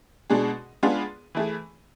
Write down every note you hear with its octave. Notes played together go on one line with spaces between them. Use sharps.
B2 G#3 D4 G#4
G#3 B3 D4 F4 G#4
E3 A3 E4 G#4